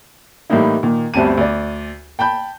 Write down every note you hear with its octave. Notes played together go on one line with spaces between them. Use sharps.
A2 E3 G3 A#3 D#4 E4
A#2 D#3
G1 D2 G3 C4 A5 D#7
D2 D5
G5 A5 B5 G6